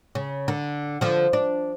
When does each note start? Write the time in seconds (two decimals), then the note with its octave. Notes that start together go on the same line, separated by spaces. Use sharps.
0.15 C#3
0.48 D3
1.01 D3 F3
1.33 D4